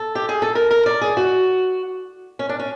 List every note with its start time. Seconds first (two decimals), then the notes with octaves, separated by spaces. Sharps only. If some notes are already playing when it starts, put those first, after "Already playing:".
Already playing: A4
0.15 G4
0.29 G#4
0.42 A4
0.55 A#4
0.71 A#4
0.86 D5
1.01 G#4
1.17 F#4
2.39 C#4
2.49 D4
2.59 C#4